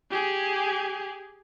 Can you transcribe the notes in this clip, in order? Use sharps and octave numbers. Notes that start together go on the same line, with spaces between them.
G4 G#4